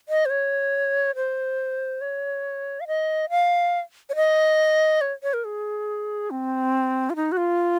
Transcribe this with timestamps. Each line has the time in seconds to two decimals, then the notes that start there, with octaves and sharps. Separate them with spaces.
0.09 D#5
0.26 C5
0.30 C#5
1.16 C5
2.01 C#5
2.80 F5
2.87 D#5
3.30 F5
4.10 C#5
4.16 D#5
5.01 C#5
5.23 C#5
5.34 A#4
5.45 G#4
6.31 C4
7.10 F4
7.16 D#4
7.32 F#4
7.37 F4